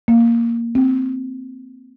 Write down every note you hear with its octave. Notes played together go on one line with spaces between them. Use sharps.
A#3
C4